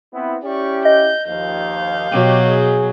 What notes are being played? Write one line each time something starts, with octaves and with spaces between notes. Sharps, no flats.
B3 C4 E4
C#4 E4 G4 D5 C#6
D#5 G6
D#2 F3 F5 G6
B2 F#3 G4
G#4